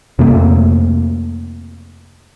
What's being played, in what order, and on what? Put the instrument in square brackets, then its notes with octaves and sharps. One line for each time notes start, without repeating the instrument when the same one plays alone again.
[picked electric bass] F2 C3 A3 A#3